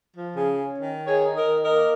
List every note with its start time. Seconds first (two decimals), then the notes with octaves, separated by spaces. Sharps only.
0.14 F3
0.36 C#3 G#4
0.57 C#4
0.79 D#3
1.01 D#4
1.07 G#4 C#5
1.22 D#4
1.36 A#4 D#5
1.43 D#3
1.65 A#3 A#4 D#5